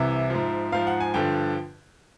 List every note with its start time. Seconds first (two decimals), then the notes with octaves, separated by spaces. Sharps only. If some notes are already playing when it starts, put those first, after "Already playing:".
Already playing: C2 C3 E3 E5
0.30 G#2 F3
0.72 G#2 F3 F5
0.87 F#5
1.00 G#5
1.14 G2 D3 F3 G5